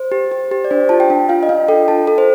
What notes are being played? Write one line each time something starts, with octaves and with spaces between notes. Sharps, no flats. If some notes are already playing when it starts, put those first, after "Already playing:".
Already playing: C5
G4
G4
G4
D5
D4 C5
F4 A5
G5
D4
F4 F5
D#5
D4 F5
A4 G5
F4 A5
A4
C5